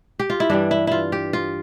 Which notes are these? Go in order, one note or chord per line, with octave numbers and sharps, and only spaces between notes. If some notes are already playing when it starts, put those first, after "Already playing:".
G4
F4
E4
G2 E3 G3 D4
E4
E4 F4
G4
F4